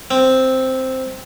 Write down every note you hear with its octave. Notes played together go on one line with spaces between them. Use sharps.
C4